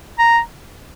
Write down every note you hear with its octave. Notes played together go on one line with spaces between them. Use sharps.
A#5